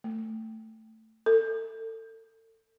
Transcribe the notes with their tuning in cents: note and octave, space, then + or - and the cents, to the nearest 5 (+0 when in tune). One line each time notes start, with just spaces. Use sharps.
A3 +10
A4 +35